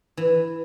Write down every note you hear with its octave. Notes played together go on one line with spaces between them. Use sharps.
E3